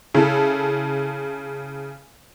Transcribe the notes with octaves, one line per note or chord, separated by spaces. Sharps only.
C#3 E4 A4